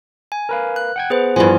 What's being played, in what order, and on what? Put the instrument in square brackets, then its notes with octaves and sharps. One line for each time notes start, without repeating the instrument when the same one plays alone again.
[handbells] G#5
[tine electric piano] A#4 B4 F5
[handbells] F#6
[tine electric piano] F#5 G5 G#6
[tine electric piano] B3 [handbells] G#4 B4 C5
[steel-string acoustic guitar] G2 E3 F3 [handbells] G#5